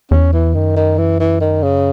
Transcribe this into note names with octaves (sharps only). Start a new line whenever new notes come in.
E2 C#4
E3
F#2 D#3
D#3
E3
E3
D#3
C#3